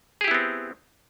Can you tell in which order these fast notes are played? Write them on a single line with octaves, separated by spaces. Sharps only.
G#4 G4 E4 B3 C4